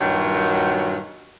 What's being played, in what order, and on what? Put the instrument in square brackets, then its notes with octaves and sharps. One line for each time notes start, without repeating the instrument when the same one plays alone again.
[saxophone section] G2 A#2 D#3 F#3